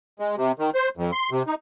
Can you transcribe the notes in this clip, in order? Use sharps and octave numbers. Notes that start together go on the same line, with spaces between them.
G#3
C3
D#3
C5
F2
C6
C3
D#4